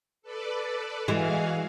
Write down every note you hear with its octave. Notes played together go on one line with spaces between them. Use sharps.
A4 B4 D5
E3 G#3 F#4 G#4 F5